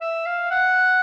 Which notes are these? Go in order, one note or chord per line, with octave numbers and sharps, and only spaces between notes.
E5
F5
F#5